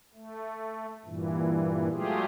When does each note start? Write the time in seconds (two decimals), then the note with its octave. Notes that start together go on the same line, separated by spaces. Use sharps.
0.14 A3
1.06 G2 A#2 E3
1.93 F#3 G#3 A3 F4 G4 G#4